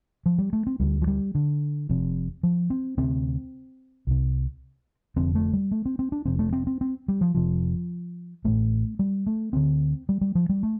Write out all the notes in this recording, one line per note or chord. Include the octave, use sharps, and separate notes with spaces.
F3
G3
A3
C4
D2 D3 G3
F3
G3
D3
F1 F2 C3
F3
C4
D2 C3 C4
C2 C3
F1 F2 D3 C4
A3
G3
A3
C4
C4
D4
F1 F2 C3 C4
A3
C4
C4
C4
G3
F3
F1 F2 C3 F3
A1 A2 A3
G3
A3
D2 D3 C4
G3
G3
F3
G3
A3